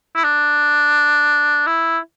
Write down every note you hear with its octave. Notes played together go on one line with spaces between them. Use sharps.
E4
D4
E4